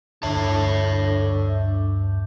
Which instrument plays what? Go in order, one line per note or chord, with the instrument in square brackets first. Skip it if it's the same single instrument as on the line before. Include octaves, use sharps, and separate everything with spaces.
[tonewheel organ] D2 G2 [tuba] D3 [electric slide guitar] C#5 E5 A5